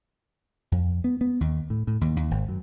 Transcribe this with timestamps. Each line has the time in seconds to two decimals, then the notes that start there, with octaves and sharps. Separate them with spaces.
0.72 F2
1.04 B3
1.21 B3
1.41 D#2
1.70 A2
1.87 A2
2.01 D#2
2.16 D#2
2.31 G#1
2.49 F#2